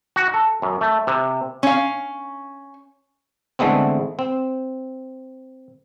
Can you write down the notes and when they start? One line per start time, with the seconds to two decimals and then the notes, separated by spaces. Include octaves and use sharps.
0.16 F#4
0.34 A4
0.62 F#2
0.81 A3
1.07 C3
1.63 C#4 F5
3.59 D3 E3 G#3 A3 B3 C4
4.19 C4